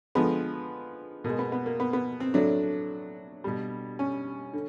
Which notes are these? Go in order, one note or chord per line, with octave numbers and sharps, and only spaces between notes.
D3 F3 G#3 B3
B2 G#3 A#3
B3
B3
A#3
B3
B3
C4
A2 F#3 A3 D4
B2 G3
C#4
D3